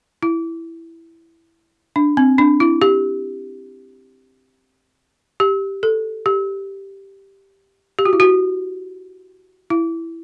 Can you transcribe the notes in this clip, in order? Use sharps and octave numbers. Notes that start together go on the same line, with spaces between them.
E4
D4
C4
D4
E4
G4
G4
A4
G4
G4
F#4
E4
F#4
E4